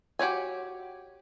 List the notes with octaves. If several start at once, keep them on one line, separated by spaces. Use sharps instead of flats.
F#4 G4 C#5 G#5